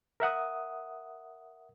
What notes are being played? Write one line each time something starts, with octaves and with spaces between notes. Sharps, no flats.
A#4 E5 F#5 D#6